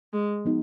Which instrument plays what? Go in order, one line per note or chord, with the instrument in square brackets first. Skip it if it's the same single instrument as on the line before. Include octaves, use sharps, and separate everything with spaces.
[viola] G#3
[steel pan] F3 B3 D#4 F#4